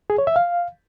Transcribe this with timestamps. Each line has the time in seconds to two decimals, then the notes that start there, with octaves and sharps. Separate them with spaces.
0.10 G#4
0.18 C#5
0.27 E5
0.36 F5